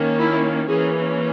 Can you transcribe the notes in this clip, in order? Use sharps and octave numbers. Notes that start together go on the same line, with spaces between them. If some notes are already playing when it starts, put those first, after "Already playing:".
Already playing: D#3 A#3 C#4
E4
E3 A#3 C#4 G#4